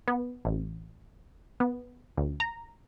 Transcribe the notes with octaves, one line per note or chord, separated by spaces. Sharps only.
B3
A1
B3
D2
A#5